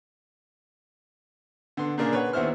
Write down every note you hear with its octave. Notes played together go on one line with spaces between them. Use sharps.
D3 B3 C6
A#2 C#3 A#3 D4 G#4 A#4
B4 C#5 F#5
D#2 B3 E4 C5 F6